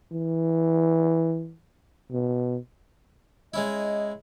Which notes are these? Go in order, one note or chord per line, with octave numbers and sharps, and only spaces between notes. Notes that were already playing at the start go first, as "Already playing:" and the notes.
E3
B2
G#3 C#4 E4 D#5